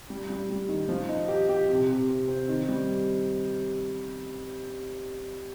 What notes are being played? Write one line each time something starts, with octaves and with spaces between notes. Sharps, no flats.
G3
G3
G3
D#3
F3
D#4
G4
G4
C3
C3
C3
C4
D#3
G3